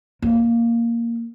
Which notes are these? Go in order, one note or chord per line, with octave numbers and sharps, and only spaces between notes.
A#3